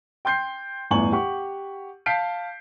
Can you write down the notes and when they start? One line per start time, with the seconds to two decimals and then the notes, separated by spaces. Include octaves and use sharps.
0.25 G5 C6 G6 C7
0.91 G1 E2 A2 G#5 C#6 F#7
1.13 G4 F#5 C#6
2.06 F5 A5 G6 B6 C7 D7